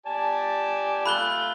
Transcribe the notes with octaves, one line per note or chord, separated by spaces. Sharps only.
G4 D5 G#5 A5
A3 F4 F5 B5 F#6 G7